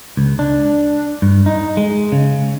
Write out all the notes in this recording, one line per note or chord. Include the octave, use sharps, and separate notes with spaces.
C#2
D4
G2
D#4
G#3
C#3